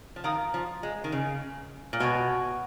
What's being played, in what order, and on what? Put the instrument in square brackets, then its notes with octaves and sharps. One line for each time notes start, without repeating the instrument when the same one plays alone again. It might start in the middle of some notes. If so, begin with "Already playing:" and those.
[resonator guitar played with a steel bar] F3
[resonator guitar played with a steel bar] D#3 [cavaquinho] A#4 F5 A#5 D#6
[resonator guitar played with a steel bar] F3
G#3
D#3
C#3
A#2
[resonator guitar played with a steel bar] B2 [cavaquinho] F#4 C#5 G#5